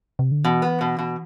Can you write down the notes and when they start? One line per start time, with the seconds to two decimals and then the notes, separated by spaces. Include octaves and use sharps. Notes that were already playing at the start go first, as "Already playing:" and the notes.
0.19 C3
0.31 D3
0.44 B2 E3
0.62 B3
0.81 B2
0.99 B2